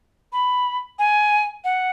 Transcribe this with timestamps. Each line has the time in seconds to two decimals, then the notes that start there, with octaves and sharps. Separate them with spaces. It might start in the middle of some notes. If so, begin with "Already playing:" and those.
0.33 B5
0.99 G#5
1.64 F#5